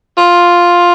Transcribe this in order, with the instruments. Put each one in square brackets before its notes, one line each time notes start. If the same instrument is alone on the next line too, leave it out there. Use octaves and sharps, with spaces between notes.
[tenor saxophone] F4